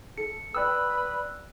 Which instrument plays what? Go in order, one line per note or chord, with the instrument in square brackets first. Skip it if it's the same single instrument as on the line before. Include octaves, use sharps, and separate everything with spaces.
[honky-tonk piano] A4 [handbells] C#7
[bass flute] B4 [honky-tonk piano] D5 G5 D#6 [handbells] E6 F#6